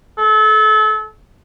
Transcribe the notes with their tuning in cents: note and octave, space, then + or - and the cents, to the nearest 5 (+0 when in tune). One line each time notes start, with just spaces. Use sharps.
A4 -30